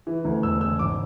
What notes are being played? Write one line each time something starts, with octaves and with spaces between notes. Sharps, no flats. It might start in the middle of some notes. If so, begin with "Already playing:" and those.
E3
D2
E1 E6
C#3 E6
G#1 D6